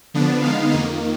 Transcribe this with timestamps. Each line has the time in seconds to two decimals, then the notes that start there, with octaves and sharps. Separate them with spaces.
0.14 D3 F3 B3 D4
0.42 D3 G#3 B3 D#4 F5
0.71 F2 D#3 A#3 D#4